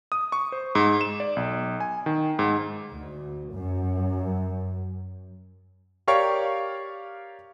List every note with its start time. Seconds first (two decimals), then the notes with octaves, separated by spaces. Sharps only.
0.12 D#6
0.32 C#6
0.52 C5
0.75 G#2
1.01 E7
1.20 D5
1.36 B1
1.80 G#5
2.06 D#3
2.39 G#2
2.92 D2
3.54 F#2
6.08 G4 A#4 C#5 D5 F5 C#6